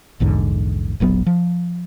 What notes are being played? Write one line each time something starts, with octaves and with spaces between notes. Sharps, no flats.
A#1 E2 G#2 D3
E1 A#1 F#3 B3
F3